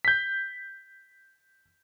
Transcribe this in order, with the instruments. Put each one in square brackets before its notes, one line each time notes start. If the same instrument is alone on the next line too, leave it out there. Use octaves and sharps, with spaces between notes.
[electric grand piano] G6 B6